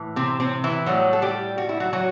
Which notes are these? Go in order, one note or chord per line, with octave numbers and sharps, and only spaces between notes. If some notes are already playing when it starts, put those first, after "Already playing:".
Already playing: A2 E3
C3 C4
C3 C4
E3 E4
A2 F#3 G3 F#4
A4
G3 G4
F#4
E4
F#3 F#4
F#3 F#4